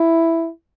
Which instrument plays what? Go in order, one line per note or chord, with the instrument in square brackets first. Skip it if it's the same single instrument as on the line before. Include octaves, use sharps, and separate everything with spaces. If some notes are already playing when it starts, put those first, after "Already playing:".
Already playing: [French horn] E4